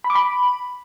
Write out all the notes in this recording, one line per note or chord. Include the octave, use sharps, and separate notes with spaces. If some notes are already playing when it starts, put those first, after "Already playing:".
B5
D6
B5